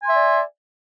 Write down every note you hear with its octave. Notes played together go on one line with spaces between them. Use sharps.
D5 E5 G#5 C6